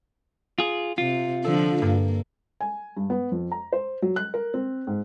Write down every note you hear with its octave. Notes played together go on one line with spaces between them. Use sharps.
F4 G#4
C3 F4
D3 F3 A4
G2 A#3
G#5
G2
B3
F2
A#5
C5
F#3
F#6
A#4
C4
G#2